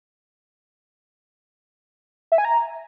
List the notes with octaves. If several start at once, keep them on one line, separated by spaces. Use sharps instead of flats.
E5
G#5
A#5